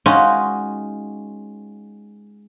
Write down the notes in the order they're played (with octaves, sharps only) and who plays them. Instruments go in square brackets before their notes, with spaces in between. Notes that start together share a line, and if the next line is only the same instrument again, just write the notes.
[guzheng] G#3 C#4 D#4 F4 F#4